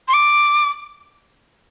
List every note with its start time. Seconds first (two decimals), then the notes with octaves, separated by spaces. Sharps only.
0.08 C6
0.14 D6